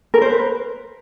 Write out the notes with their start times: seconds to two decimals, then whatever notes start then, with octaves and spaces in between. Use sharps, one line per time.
0.14 A#4
0.22 C5
0.30 B4